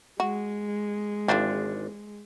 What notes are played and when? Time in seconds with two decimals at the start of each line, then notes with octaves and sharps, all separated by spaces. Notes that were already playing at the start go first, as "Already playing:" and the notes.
0.20 G#3 F#4
1.28 G#1 E3 F3 C4 D4